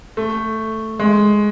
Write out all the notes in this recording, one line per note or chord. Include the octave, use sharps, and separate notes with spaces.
A3
G#3